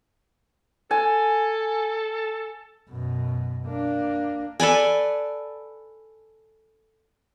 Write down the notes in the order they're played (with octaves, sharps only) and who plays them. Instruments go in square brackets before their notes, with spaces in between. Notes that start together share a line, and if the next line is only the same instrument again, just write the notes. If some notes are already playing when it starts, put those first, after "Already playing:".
[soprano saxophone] A4 [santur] G#5
[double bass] F#2 B2
A#3 D4
[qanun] A4 B4 D5 G#5